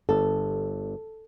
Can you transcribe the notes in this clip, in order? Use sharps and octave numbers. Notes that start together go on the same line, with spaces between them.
G1 A4